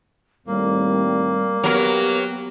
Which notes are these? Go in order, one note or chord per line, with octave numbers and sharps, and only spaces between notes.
D#2 A2 G3 A#3 C4
F#3 B3 G4 A#4